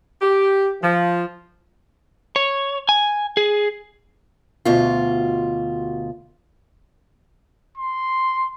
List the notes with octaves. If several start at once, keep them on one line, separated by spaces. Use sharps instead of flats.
G4
F3
C#5
G#5
G#4
D2 B2 F4
C6